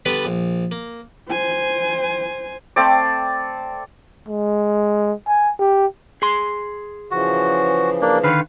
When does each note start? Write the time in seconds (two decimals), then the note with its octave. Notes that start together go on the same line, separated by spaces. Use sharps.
0.05 D3 G3 B3 B4 D5
0.25 A#1
0.71 A#3
1.30 C5 G#5
2.76 A3 C4 D5
4.28 G#3
5.27 G#5
5.59 G4
6.22 G#4 C6
7.11 C#3 E3 F3 F#4
8.02 A#3 D4
8.24 D3 D#3 B4 F5